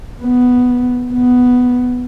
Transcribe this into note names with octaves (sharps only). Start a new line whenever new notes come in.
B3
B3